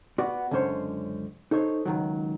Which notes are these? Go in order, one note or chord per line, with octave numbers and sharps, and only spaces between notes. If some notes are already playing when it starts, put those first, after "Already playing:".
B3 F#4 D5
C#2 F#2 D3 C#4 C5 C#5
D#4 A4 C5 C#5
C#2 D#3 F#3